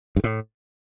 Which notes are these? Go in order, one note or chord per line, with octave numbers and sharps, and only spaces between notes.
G2
A2